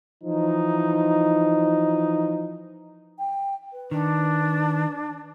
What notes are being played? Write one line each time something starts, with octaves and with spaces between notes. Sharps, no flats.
E3 F3 D#4
G5
B4
D#3 D4